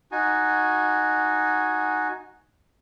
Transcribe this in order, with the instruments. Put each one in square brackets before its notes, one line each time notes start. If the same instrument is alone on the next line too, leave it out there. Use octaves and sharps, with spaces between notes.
[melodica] D#4 F#4 G#5